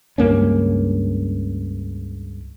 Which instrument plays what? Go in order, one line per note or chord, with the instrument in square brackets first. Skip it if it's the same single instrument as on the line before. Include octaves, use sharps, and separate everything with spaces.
[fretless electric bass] C#2 G2 A#3 C#4